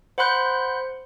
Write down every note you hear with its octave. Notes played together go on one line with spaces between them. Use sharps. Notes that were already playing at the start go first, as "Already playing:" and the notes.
C5 F#5 B5 C6 F#6 G6